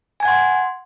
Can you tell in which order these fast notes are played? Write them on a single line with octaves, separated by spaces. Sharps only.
G#5 G#6 F#5 C6